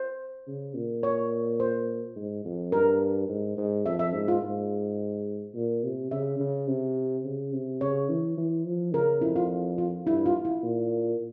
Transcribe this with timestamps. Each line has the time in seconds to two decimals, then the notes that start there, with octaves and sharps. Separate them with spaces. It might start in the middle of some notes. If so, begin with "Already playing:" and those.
Already playing: C5
0.47 C#3
0.74 A#2
1.03 C#5
1.60 C5
2.16 G#2
2.45 F2
2.72 G2 A#4
3.29 G#2
3.57 G#2
3.86 F2 E5
3.99 E5
4.14 G#2
4.28 F4
4.42 G#2
5.55 A#2
5.84 C3
6.11 C#3 E5
6.39 C#3
6.67 C3
7.25 C#3
7.53 C3
7.81 C#3 C#5
8.09 E3
8.37 E3
8.65 F3
8.94 C#3 A#4
9.22 F2 E4
9.36 F4
9.78 F4
10.06 G2 E4
10.26 F4
10.45 E4
10.63 A#2